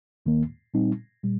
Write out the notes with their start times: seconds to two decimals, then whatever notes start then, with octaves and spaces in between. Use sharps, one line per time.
0.26 D#2 D#3 A#3
0.74 A#2 G3 C4 D#4
1.23 A#2 G3